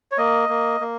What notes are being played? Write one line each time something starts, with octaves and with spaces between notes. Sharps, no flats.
C#5
A#3 D#5
A#3
A#3